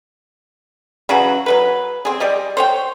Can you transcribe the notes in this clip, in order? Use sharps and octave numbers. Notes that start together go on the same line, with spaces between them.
C#3 E3 F#3 F#4
F#3 G#3 B4
C4 G#4
G3 G4 D5 D#5
C5 C#5 G5